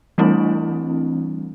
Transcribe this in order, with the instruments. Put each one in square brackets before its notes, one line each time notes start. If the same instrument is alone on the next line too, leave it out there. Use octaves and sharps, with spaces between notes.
[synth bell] E3 G3 A3 C4 D4 E4